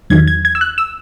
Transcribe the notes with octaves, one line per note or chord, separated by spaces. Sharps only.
E2 D#3 F#3 G#6
G#6
G#6
E6
F#6
E6